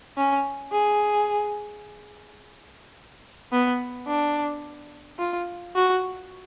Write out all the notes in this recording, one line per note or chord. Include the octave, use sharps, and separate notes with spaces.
C#4
G#4
B3
D4
F4
F#4